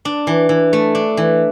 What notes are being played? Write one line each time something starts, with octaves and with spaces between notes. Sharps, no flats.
D4
E3
E3
A3
D4
E3